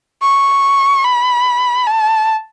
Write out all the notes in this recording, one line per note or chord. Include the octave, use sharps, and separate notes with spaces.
C#6
B5
A5